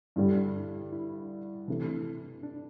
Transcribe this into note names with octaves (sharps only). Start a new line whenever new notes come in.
G2 D3 G3 E4
D4
E4
C3 E3 A3 D4
D4